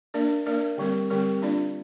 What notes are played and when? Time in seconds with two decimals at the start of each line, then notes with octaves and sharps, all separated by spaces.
0.14 A#3 D4 A#4 D5
0.46 A#3 D4 A#4 D5
0.78 D3 G3 C4 A#4
1.10 D3 G3 C4 A#4
1.42 A#3 D4 F4 D5